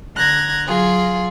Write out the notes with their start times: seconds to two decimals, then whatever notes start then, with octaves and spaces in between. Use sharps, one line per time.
0.16 D3 A#5 F#6 G#6 A#6
0.66 F#3 F4 G#4